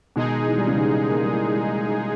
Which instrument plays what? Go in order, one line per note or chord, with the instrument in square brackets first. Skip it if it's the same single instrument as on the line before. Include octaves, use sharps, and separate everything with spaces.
[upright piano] B2 D#3 [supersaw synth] G#3 D#4 G#4
[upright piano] E3
G3
C#3 E3
D#3 G3
A#3
G#3
G3
E3 G#3
D#3 G3